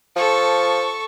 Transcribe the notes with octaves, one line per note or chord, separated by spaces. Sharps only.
F3 A4 C#6